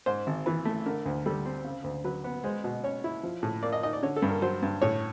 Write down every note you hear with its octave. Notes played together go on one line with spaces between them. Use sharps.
G#2 C5
G#1
E3 B4
A3
D3 A#4
D2
G3 A4
C4
C#3
D2
F#3 B4
B3
G#3 C5
B2
C#4 C#5
E4
F3
A2
A#3 D5
D#5
D#4 D#5
D5
D3 C#5
A4
G2
A#4
F#3 C5
G2
A2 C#5